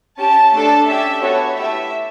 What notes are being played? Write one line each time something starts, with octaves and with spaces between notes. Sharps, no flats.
C#4 G4 A5
A3 D4 A4 A5
C#4 G4 E5
B3 F#4 A4 C#5
A3 E4 G4 E5